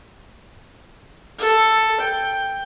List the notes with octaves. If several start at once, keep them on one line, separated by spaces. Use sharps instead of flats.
A4
G5